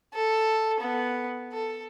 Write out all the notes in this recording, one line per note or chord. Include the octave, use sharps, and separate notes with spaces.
A4
B3
A4